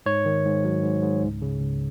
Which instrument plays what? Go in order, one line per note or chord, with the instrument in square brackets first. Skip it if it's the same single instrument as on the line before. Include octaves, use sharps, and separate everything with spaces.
[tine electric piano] G#2 C#5
D#3
G#2
F#3
G#2
G#2
C#2
C#3
C#2